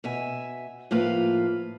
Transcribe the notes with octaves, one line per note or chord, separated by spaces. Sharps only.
B2 E5 G#5
A2 F3 A#3 F4 B4 F5